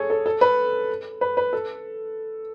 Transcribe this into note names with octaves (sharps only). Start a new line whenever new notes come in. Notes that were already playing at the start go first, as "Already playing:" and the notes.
Already playing: G#4 A4 C#5
A4
A4
B4
B4
B4
A4